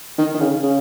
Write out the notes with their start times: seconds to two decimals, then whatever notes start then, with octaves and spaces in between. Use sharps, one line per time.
0.18 D#3
0.34 D#3
0.40 C#3
0.63 C#3